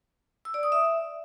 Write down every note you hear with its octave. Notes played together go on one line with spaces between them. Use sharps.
E6
D5
D#6
E5